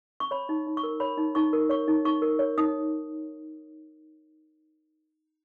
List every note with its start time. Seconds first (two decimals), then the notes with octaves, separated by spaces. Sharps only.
0.20 C#6
0.31 C#5 B5
0.49 D#4
0.67 D#4
0.77 C#6
0.83 A#4
1.00 C#5 B5
1.17 D#4
1.35 D#4 C#6
1.53 A#4
1.70 C#5 C#6
1.88 D#4
2.05 D#4 C#6
2.22 A#4
2.39 C#5
2.58 D#4 D#6